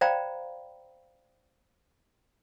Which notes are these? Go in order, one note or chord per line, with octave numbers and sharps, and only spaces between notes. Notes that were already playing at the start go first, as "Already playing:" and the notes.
C5 D5 F5 G5 A#5 B5